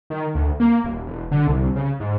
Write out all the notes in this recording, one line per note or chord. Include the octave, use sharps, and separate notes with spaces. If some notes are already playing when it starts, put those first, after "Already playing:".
D#3
D2
A#3
D#1
E1
D3
C2
C#3
G#2